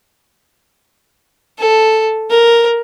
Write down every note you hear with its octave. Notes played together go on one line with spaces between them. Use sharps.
A4
A#4